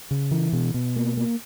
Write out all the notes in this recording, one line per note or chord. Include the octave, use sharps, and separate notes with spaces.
C#3
E3
B2
B2
A#3
A#3